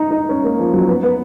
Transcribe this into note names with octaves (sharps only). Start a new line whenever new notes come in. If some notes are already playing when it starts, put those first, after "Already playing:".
Already playing: D#4
D#4
C#4
A#3
F3
F#3
B3
B3